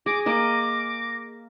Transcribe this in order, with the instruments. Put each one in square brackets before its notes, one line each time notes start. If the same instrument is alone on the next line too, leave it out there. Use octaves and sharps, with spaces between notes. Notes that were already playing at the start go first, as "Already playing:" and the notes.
[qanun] G#4 [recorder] D6 [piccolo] A#6
[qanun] A#3 A#4 D#5 [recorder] D6